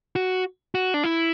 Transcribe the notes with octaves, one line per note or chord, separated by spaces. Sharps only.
F#4
F#4
D4
E4